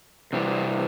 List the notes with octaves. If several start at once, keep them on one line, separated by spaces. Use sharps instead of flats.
C3 E3 G3